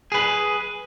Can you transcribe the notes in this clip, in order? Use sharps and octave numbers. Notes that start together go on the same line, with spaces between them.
G#4 B4